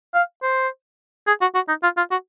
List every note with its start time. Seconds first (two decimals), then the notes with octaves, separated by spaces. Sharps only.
0.14 F5
0.42 C5
1.27 G#4
1.41 F#4
1.55 F#4
1.68 D#4
1.83 F4
1.97 F4
2.11 F#4